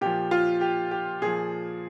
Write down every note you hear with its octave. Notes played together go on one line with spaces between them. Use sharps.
A#2 F3 G4
F4
G4
G4
A#2 F3 G#4